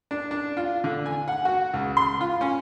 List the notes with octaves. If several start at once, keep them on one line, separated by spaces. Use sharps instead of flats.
D4
D4
F4
D3
G#5
F#5
F#4
C#2
C6
F4
C#4